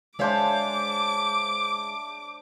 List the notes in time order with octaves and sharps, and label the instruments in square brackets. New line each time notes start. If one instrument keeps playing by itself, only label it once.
[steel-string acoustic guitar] G#3 C#5 F5 [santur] D4 C5 E5 [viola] D6